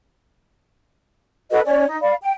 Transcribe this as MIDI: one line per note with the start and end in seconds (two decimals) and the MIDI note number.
1.52 1.60 66
1.52 1.60 69
1.52 1.60 71
1.52 1.60 75
1.65 1.85 61
1.65 1.85 73
1.65 1.85 74
1.89 1.97 63
2.01 2.14 74
2.01 2.14 77
2.01 2.14 83
2.21 2.33 79